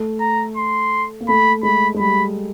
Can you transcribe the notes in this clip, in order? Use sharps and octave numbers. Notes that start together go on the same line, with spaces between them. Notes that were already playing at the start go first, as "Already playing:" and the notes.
Already playing: A3
A#5
C6
A#3
A3 B5
G#3 B5
G#3
G3 B5